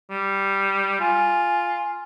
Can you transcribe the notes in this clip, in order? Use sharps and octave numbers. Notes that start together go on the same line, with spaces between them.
G3
F4 G#5